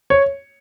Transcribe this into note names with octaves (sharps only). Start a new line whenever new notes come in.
C#5